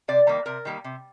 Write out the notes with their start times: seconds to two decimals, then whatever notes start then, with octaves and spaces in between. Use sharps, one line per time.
0.08 C3 D5
0.27 D#3 G3 A#3
0.46 C3 A#4
0.65 D#3 G3 A#3
0.84 C3